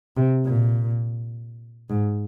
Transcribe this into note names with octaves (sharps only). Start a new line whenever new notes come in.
C3
A#2
G#2